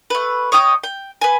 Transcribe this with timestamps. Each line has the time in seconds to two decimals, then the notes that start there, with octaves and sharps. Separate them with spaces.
0.10 A3 B4
0.52 C#5 D#5 G5 D#6
0.83 G5
1.21 B4 G#5